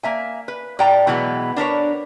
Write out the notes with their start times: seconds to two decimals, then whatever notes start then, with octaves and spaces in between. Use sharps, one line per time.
0.03 A#3 E5 G#5
0.48 B4
0.79 A2 D5 G5 A#5
1.07 B2 E3 F#3 G#3 B3
1.56 D4 A#4 B4 C#5